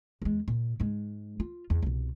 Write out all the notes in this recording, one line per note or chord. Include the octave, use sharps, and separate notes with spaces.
E2 G#3
A#2
G#2 G#3
F4
E2
C2 B2